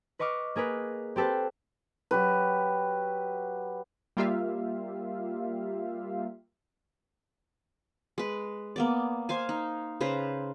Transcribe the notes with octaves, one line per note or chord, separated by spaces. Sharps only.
B4 D#5 C#6 D6 F6
A#3 G#4 A#4 B4
C4 G4 A4 B4 C5
F#3 G4 B4
G3 A#3 F4 G4 E5 F5
G#3 B4
A#3 B3 D5
C5 F5 G#5
D#4
C#3 B4 C5 A#5